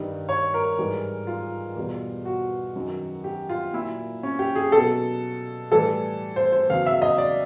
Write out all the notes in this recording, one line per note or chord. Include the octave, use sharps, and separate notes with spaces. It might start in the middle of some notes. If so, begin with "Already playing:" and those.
Already playing: G2 D#3 G3
C#5
A#4
G#2 E3 G3
F4
E2 B2 G3
F#4
F#2 D#3 F#3
G4
F4
A#2 F#3 E4
C#4
G4
G#4
B2 F#3 A4
A2 E3 G3 A4
C5
C5
E2 C#3 F#3 F5
E5
D#5
D5